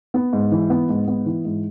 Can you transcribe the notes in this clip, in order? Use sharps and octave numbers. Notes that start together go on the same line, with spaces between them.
B3
G#2
E3
B3
G#2
B3
E3
G#2